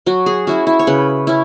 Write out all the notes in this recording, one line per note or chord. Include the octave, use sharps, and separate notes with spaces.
F#3 F#4
G#4
C#4 E4 F#4
E4
C#5
C#3 B4
C#4 E4